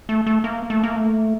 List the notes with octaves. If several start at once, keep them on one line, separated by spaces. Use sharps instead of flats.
A3
A3
A#3
A3
A#3
A3